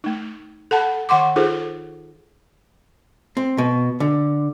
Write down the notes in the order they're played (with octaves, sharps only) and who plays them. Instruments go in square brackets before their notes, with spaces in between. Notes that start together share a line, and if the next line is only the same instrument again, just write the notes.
[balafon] A3 D#4
A4 F#5 A5 B5
D#3 F#5 C6 D6
D#4 F4 G#4 A4 C5
[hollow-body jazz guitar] C4
B2
D3